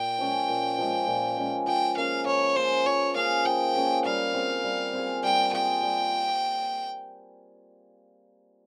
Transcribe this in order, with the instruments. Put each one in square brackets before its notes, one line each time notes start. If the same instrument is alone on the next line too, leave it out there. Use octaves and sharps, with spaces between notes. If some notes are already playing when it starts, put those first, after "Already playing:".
Already playing: [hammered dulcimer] A#2 [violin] G5
[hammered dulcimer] F3 G#3 C#4
A#2
F3 G#3 C#4
A#2
F3 G#3 C#4
[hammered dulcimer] F3 [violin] G5
[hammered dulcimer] A#3 C#4 G#4 [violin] F5
[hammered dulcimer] F3 [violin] C#5
[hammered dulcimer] A#3 C#4 G#4 [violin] C5
[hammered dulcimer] F3 [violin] C#5
[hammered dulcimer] A#3 C#4 G#4 [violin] F5
[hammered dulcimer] F3 [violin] G5
[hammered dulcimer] A#3 C#4 G#4
[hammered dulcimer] G3 [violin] F5
[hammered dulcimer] C4 F4 G#4
G3
C4 F4 G#4
[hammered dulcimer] G3 [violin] G5
[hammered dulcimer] C4 F4 G#4 [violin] G5
[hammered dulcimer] G3